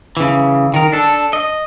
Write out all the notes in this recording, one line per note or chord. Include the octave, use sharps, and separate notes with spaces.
C#3 E3
D#3 A#4
D4 A4
D#5